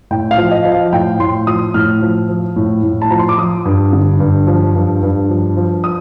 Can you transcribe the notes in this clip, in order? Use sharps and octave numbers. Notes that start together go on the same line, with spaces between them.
A2 G5
F5
F3
D#5
F3
F5
A2 G5
A2 C6
F3 D#6
A2 F6
F3
F3
A2
A2
A5
F3 A#5
C6
D6
F3 D#6
G2
D3
G2
F3
G2
G2
F3
F3
D#6